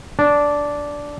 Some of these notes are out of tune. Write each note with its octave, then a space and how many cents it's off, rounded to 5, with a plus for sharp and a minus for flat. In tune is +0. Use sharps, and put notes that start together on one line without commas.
D4 -10